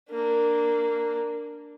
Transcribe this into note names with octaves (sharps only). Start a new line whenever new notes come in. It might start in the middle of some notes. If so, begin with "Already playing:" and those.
A#3 D4